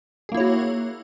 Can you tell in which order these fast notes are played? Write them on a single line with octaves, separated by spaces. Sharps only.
G#4 A#3 E4 C#5 F#4